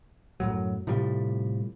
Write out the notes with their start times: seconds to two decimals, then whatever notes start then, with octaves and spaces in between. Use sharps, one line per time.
0.40 F#2 A2 F#3
0.87 A2 C3 F3 G3